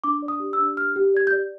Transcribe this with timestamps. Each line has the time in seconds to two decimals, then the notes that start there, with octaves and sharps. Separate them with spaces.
0.04 D4 D6
0.22 D5
0.28 D#6
0.40 G4
0.53 E6
0.59 D4
0.77 G4 F6
0.96 G4
1.14 D5 G#6
1.27 G6
1.32 D5